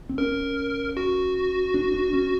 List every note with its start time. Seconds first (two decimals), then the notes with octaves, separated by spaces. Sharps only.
0.09 C4
0.18 C#4 A#4
0.97 F#4
1.74 D4
1.94 D4
2.13 C#4